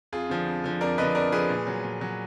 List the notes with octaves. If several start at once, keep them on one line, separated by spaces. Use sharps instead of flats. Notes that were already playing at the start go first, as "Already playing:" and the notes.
F2 F4 G#4
D3 F3
F2
D3 F3
F2 A#4 D5
D3 F3 B4 D#5
F2 A#4 D5
D3 F3 G#4 B4
A#2
F#3
A#2
F#3